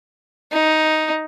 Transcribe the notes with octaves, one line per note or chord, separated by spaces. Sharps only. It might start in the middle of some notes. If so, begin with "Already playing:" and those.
D#4